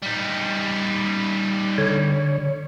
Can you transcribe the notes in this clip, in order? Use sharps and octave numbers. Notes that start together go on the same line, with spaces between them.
G3 D#4
D3 C#5